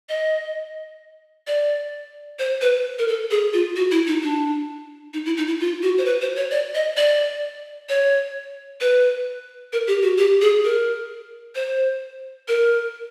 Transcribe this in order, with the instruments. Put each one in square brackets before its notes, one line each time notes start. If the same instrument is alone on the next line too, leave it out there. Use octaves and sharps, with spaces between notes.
[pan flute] D#5
D5
C5
B4
A#4
A4
G#4
F4
F#4
E4
D#4
D4
D#4
E4
D#4
E4
F4
F#4
C5
B4
C5
C#5
D5
D#5
D5
C#5
B4
A#4
G4
F#4
G4
G#4
A#4
C5
A#4